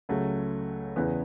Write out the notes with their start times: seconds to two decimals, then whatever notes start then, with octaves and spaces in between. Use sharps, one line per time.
0.09 C#2 C#3 F#3 A3
0.96 E2 C#3 E3 B3